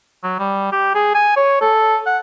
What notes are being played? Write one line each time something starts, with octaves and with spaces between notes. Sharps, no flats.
F#3
G3
G4
G#4
G#5
C#5
A4
F#5